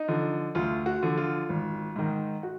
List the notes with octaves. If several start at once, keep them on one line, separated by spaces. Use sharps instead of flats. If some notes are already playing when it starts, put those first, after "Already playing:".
Already playing: D#4
D3 F3
D2 F4
F#4
D3 F3
F4
G#1
G#2 D#3
F#4